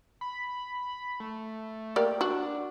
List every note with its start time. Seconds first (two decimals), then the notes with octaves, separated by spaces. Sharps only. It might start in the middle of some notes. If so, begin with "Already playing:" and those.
0.21 B5
1.20 A3
1.96 A#3 G4 D5
2.21 D4 F#4